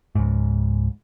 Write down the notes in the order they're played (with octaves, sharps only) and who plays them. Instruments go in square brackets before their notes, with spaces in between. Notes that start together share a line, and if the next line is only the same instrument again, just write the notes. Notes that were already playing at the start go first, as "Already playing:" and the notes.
[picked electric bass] C#2 G#2